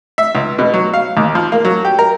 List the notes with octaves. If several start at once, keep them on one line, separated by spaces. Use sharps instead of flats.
E5
C#2
B2
F#3
F5
D#2
F3
A#3
F#3
G4
A#4